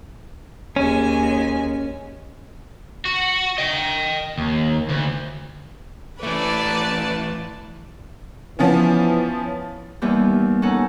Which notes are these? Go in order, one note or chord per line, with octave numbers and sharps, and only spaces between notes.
D#2 G#3 C#4 G#5
F#4
D#5 G5
D#2
D2
E3 A3 B4 D5 A5
E3 F3 B3 C#4
D#2 E3 G3 B3
C#4 D#4 A4 F#5